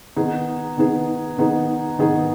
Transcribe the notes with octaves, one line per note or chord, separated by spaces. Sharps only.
D#3 B3 D#4 G#4
D#3 B3 D#4 G#4
D#3 B3 D#4 G#4
D#3 B3 D#4 G#4